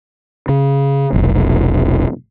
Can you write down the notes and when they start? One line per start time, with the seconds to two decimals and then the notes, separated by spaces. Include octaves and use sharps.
0.49 C#3
1.13 F1 B1